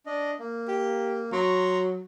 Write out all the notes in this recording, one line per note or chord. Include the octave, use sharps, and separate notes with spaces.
D4 D#5
A#3
G4
F#3 A#5 C6 C#6